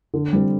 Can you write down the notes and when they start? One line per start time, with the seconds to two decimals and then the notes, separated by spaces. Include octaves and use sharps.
0.14 D3
0.33 G3 C4